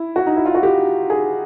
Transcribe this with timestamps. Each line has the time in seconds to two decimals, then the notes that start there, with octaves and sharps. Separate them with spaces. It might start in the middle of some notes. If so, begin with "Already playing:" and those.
Already playing: E4
0.16 F#4
0.27 D#4
0.36 E4
0.46 F4
0.55 F#4
0.63 G4
1.10 G#4